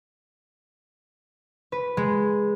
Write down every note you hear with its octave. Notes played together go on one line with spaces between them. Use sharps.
B4
G#3